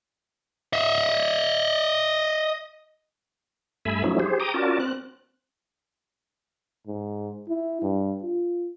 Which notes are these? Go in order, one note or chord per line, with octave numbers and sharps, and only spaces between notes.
D#5 E5
G2 A3 E5 G#5 B5
F3 F#3 A3 C#4 D#4 E4
G4 G#4 C5
G5 A#5 D6 D#6
C#4 F4 F#4 A#4 D5 A5
C4 F#6
G#2
E4
G2
F4